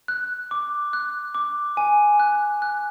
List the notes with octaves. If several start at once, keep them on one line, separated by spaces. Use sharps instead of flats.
F#6
D6
F#6
D6
G#5
F#6
F#6